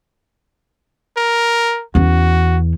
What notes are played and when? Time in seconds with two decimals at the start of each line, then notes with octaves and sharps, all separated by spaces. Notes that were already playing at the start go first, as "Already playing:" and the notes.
1.17 A#4
1.95 E2 C#4 F#4